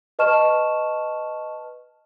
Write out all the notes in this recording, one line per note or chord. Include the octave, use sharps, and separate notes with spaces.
B4 D#5 A5 C#6 F6 E7